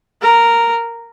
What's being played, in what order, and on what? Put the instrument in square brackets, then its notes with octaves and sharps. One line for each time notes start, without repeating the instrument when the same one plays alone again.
[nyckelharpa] A#4